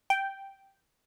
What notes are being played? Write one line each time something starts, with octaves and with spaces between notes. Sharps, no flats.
G5